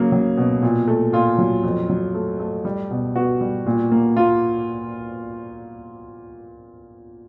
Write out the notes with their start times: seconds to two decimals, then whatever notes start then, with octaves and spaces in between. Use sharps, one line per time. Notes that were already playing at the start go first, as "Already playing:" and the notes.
Already playing: C#3 F#3 A#3
0.12 F#3
0.37 B2
0.62 A#2
0.88 A3
1.13 A#2 F4
1.38 F#3
1.64 F2
1.89 F#3
2.14 A3
2.40 A3
2.65 G3
2.91 B2
3.16 B3 F#4
3.41 G3
3.66 A#2
3.92 A#3
4.16 A#3 F4